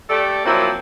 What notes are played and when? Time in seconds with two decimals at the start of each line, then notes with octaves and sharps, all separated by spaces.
0.10 A3 G4 A4 D5
0.46 F3 F#3 A#3 C4 E4